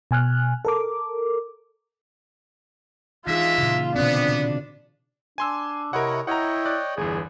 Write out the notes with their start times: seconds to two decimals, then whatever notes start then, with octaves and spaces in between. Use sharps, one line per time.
0.11 B2 G#5 F6 F#6
0.65 A4 A#4 D6
3.27 E3 G#3 D4 D#4 F4 G#4 E5
3.58 A#2 C#3
3.96 B2 D3 B3 C4 D4
4.29 D3
5.38 D4 G#5 C6 E6
5.93 C3 E4 A#4 C#5 D#5 F#5
6.27 E4 C#5 D#5 F#5 G5 A#5
6.66 D5 F#6
6.97 G1 E2 G#4